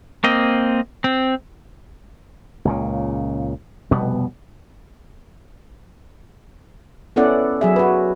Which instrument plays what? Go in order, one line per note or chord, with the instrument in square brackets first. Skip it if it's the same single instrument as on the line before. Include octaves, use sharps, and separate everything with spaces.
[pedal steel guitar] A#3 C4 D#5
C4
[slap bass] C#2 A#2 C#3
F1 B2 G3 B3
[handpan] B3 C#4 E4 A4 D5 F#5
F#3 G#4 E5
F#4 B4